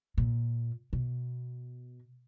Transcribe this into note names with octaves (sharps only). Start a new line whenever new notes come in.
A#2
B2